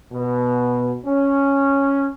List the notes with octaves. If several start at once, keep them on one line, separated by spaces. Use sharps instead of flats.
B2
C#4